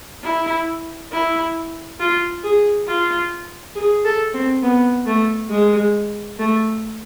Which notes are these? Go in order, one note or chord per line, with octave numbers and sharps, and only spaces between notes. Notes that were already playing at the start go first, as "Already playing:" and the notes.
E4
E4
F4
G#4
F4
G#4
A4
C4
B3
A3
G#3
A3